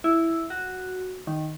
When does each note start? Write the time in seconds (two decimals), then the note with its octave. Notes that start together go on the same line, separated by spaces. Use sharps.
0.04 E4
0.50 F#4
1.27 D#3